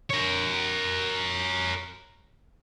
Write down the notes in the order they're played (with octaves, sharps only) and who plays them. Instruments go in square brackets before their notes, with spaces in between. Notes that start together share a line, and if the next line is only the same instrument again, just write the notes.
[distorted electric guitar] A#4 C#5